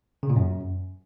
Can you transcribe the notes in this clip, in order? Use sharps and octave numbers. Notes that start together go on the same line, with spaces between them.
C#3
A#2
F#2